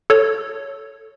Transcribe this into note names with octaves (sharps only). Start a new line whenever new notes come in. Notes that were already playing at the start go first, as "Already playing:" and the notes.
A4 C#5